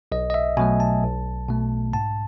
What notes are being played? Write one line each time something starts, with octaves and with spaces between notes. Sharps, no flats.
B1 D#5
D#5
E5
B2 F#3 A3 G#5
A5
B1
B2 A3
G#2 A5